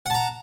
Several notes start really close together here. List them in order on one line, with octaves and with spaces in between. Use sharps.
F#5 A5 A#5